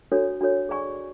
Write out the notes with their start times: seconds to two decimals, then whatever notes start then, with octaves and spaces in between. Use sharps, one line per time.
0.12 D4 F#4 A4 C#5
0.41 D4 F#4 A4 C#5
0.69 G#4 D5 G#5 C#6